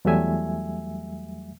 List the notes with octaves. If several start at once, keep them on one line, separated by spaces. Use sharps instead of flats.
E2 F#3 G3 A3 E5 G#5